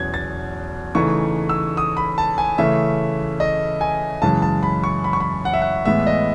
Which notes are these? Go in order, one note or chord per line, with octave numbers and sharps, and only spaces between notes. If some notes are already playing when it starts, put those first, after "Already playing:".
Already playing: E2 B2 F#3 C#4 G#6
A6
C#3 E3 A3 D#4 C#6
E6
D#6
B5
A5
G#5
C#3 E3 A3 C#4 E5
D#5
G#5
F#2 C#3 E3 G#3 A5
A5
B5
C#6
B5
C#6
B5
F#5
E5
F#5
A2 E3 G#3 B3 E5
D#5